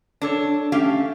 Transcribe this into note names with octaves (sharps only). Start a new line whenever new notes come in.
D4 A4 C#5
A3 C#4 G4 F5